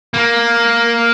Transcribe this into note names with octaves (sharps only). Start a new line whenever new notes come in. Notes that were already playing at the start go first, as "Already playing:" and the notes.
A#3